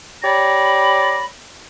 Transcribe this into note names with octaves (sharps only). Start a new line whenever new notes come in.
G4 C#5 D5 A#5 B5